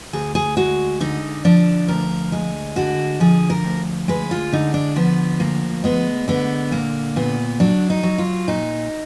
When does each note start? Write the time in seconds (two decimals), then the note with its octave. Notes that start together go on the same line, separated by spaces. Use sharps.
0.13 D2 G#4
0.35 G#4
0.57 G#3 F#4
1.00 D3 D#4
1.45 F3 D4
1.88 D2 A#4
2.32 G#3
2.76 D3 F#4
3.20 F3 G#4
3.50 A#4
3.64 D2
4.08 G#3 B4
4.31 F4
4.53 D3 D#4
4.74 D4
4.96 F3 B3
5.40 D2 A#3
5.84 G#3 B3
6.28 D3 B3
6.71 A#2 A#3
7.16 A#2 B3
7.60 F#3 D4
7.90 D#4
8.03 F#3
8.18 F4
8.48 A#2 D#4